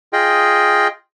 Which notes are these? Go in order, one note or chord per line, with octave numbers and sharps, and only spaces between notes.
F4 G#4 D#5 G5